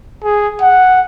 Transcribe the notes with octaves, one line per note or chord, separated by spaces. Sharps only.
G#4
F#5